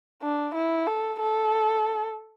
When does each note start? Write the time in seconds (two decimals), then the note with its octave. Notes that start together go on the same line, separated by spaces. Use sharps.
0.23 D4
0.55 E4
0.87 A4
1.20 A4